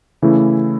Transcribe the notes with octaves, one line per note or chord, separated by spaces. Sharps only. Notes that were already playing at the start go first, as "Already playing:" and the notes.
C#3 E3 A3 E4